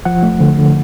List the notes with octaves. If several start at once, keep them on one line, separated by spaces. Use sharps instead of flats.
F3 F#5
A3
D3
D3